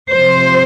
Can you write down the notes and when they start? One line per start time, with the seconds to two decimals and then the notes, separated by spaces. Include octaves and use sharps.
0.11 C3 F3 C5